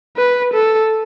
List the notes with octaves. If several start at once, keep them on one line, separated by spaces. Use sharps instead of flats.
B4
A4